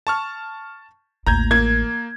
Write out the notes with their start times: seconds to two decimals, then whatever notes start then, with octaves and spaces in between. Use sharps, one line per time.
0.07 A5 C#6 F6
1.27 A1 D#2 A#5 G6 G#6
1.51 A#3 G#6